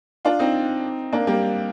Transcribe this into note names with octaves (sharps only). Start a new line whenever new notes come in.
D4 F4
C4 D#4
A#3 D4
G3 A#3